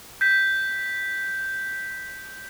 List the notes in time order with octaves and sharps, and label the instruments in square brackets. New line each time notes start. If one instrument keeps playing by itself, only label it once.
[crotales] G6 B6